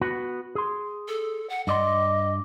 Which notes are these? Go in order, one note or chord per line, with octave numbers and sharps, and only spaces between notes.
B3 F#4 F#5
G#4 C6
A4
F#5
G2 D5 D#5 C6